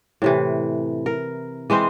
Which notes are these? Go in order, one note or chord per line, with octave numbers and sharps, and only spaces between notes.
A2 C3 E3
A#4
E3 G#3 C4 C5